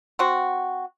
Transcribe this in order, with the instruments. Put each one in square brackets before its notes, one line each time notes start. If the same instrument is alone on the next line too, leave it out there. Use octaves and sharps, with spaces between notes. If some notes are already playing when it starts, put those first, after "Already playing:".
[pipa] C4 F#4